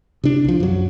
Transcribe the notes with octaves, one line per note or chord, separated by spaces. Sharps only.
C3 D4
C2 F3
F#2 F#3